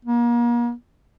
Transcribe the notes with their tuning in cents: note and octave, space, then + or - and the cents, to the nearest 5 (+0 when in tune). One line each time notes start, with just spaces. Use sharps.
A#3 +35